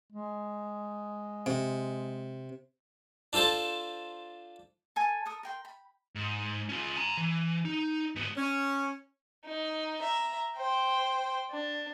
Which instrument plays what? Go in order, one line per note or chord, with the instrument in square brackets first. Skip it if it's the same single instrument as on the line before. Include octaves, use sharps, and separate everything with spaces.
[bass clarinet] G#3
[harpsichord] C3
D4 F4 A4 C5 A5
[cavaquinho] A4 G#5 A5
A4 A#4 D#6
A#4 G5 C6
B5
[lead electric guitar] G#2
C#4 F4
G#5 A#5
E3
D#4
G#2 B3
[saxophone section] C#4
[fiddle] D#4
E5 A#5
C5 G5
D4